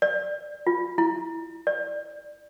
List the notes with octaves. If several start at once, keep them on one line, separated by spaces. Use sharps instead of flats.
D5
F4
E4
D5